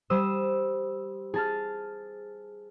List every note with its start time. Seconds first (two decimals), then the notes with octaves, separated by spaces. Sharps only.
0.10 G3 C5 D#6 E6
1.34 G#4 A5 F6